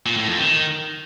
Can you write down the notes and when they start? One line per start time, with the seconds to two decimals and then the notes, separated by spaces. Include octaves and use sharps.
0.06 A#2
0.17 A2
0.28 F2
0.39 D#3